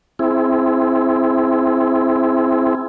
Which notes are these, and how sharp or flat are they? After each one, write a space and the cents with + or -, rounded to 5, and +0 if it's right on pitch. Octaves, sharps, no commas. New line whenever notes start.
C4 +0 E4 +0 G#4 +20